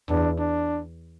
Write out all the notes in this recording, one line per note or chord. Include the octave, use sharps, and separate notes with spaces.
E2 D4
D4